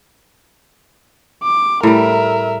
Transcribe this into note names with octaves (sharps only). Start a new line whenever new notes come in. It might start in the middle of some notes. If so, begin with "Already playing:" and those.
D6
A2 G3 A#4 E5